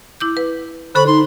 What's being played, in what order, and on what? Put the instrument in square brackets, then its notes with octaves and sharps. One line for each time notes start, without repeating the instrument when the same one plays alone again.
[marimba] E4 D6 G6
B4
[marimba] D3 A4 C#6 [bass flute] C5 [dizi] B5
[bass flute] D#4 [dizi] C6